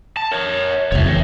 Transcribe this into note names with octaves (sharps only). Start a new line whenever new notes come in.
A5
A#4 C#5
F1 C#2 C#5 E5
E2